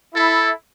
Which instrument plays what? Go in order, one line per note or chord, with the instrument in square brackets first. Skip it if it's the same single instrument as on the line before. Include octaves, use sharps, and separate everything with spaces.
[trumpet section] E4 [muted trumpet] A4